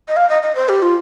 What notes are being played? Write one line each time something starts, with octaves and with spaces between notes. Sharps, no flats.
D#5
F5
D#5
D#5
C5
G4
F4